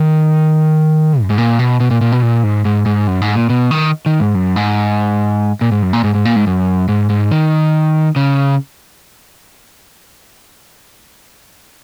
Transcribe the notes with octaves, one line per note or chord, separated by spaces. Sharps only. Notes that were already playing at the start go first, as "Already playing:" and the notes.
Already playing: D#3
F#2
G#2
A#2
B2
B2
A#2
A#2
B2
A#2
G#2
G#2
G#2
F#2
G#2
A#2
B2
D#3
D#3
G#2
F#2
G#2
A#2
G#2
F#2
A#2
G#2
G#2
A#2
G#2
F#2
G#2
G#2
D#3
C#3